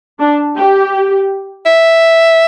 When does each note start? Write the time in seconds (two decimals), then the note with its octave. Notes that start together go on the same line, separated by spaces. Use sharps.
0.20 D4
0.57 G4
1.66 E5